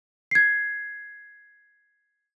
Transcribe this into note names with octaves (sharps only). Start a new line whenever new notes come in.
G#6 C7